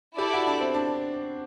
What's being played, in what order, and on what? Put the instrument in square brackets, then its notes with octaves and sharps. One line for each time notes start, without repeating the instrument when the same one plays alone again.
[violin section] E4 A4 D5 [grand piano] G4
[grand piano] F#4
D4
C4
D4